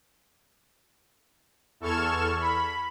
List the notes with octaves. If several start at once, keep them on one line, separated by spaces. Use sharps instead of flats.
E2 A4 C#6 F6 G#6 E7
B5